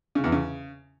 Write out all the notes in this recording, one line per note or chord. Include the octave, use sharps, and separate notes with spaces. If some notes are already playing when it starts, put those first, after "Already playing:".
C#3
E2
C#3